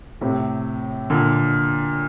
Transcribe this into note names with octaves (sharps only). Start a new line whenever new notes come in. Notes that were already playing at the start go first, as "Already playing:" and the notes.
A2 C3
A#2 D3